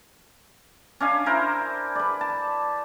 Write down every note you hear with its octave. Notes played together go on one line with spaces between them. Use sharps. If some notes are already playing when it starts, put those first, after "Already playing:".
C#4 D4 F5 G#5
E4 A#4 C5
B4 D5
A5